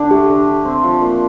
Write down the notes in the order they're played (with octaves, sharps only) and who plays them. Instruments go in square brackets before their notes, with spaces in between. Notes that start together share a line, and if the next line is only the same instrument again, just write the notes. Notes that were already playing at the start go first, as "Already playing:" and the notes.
Already playing: [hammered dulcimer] D3 D4
[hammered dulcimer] A3 [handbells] G4
[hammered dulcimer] D3
G4
C4
F3
A#2